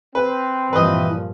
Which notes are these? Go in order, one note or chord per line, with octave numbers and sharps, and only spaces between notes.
C4 B4
G2 A#2 E3 F3 B4 D#5